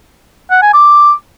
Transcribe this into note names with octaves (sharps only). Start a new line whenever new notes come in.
F#5
G#5
D6